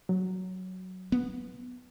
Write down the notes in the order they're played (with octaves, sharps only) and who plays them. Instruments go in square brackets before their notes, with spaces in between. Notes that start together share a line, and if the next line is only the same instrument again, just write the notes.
[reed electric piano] F#3
[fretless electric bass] B3